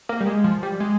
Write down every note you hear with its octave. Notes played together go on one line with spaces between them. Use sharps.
A#3
G3
G#3
F3
G3
G#3